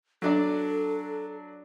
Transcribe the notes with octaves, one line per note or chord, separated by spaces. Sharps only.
F#3 D4 A4 D5